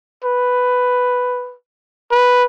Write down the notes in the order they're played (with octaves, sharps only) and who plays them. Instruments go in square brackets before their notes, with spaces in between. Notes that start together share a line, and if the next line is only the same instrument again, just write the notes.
[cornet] B4
B4